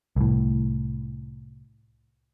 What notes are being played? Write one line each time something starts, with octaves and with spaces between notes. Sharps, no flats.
C2 A2